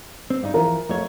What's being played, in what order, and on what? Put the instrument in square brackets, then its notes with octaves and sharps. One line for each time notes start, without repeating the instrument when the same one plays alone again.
[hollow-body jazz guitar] C4
G2 D#4
[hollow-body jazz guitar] E3 F3 [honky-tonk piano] A#4
[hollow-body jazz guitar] F2 A3 C#5